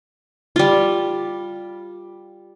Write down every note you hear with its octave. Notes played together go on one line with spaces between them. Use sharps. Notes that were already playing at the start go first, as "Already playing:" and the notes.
G3 F4